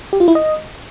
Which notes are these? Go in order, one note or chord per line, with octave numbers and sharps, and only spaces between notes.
G4
F4
E4
D#5